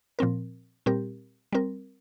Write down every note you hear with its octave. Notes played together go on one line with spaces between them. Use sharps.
A#2 F3 C4 A#4
A#2 G3 C4 G4 A#4
G3 C4 A#4